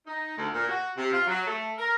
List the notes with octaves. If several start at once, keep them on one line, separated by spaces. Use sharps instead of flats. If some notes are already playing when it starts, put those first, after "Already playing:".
D#4
D2
A#2
F#4
C3
F4
F#3
A3
A#4